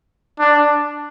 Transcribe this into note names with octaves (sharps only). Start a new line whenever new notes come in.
D4